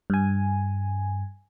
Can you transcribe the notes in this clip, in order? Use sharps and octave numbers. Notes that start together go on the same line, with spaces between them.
G2 G#5